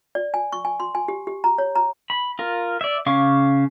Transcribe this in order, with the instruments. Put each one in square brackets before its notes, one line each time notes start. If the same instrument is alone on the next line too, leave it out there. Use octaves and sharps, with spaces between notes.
[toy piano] D5
G#5
C#6
G#5
C6
G#5
G4
G4
A#5
C#5
A#5
[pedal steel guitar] B5
F4 A#4
D5 E5
C#3 C#4 F5 C#6 D6